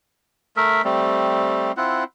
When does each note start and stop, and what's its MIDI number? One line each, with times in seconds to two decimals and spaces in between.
0.57 0.82 57
0.57 0.82 70
0.57 0.82 76
0.85 1.72 55
0.85 1.72 57
0.85 1.72 60
1.77 2.04 60
1.77 2.04 64
1.77 2.04 65
1.77 2.04 78